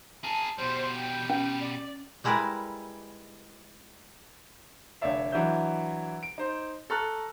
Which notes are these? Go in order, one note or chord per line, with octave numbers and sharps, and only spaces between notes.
G#4 A#4 A5
B2 G3 C5
G5
C#4
D5
G3 G#3 E4 A#4 B4 D5
F1 D3 C#5 D5 E5 F5
E3 F#3 D4 E5 G6
D7
D#4 C5
A4 A#5 C#6 F6 F#6 A6